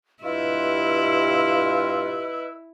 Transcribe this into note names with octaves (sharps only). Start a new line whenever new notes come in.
G2 E4 F4 G4 B4 D#5 C6 E6